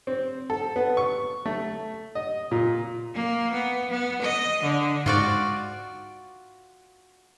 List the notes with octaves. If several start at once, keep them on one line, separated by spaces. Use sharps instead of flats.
C4
A4
B3
C#6
A3
D#5
A#2
A#3
B3
B3
D#5
D3
G#2 F4 F#4 D5